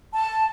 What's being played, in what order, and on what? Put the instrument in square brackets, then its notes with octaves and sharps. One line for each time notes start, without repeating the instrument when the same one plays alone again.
[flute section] A5